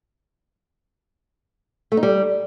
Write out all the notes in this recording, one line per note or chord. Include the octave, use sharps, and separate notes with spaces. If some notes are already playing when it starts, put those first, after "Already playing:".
A3
D#4
G3